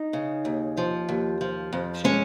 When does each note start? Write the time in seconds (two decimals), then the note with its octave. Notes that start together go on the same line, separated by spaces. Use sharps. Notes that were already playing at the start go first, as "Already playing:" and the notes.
Already playing: D#4
0.13 C#3
0.45 D#2
0.77 F3
1.09 D#2
1.41 F3
1.73 F2
2.04 G#3 C#4